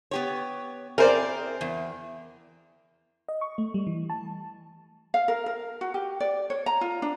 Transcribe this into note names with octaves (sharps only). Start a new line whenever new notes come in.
B3 G4 C#5
C4 E4 G#4 A#4 C5 D5
E2
D#5
C#6
A3
G3
E3
A5
F5
A#4
A#4
F#4
G4
D5
C#5
A#5
F4
D4